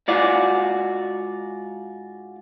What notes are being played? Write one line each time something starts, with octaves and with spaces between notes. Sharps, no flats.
G#2 F4 F#4 D5